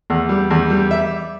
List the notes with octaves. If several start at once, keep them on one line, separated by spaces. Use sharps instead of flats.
E2
G3
E2
G3
E5